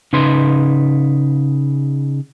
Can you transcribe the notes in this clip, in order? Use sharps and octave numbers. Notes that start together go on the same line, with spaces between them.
C#3 D#4 B4 C6